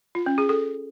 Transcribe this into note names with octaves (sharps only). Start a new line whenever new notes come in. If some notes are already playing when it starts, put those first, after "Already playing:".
F4
C#4
G#4
A4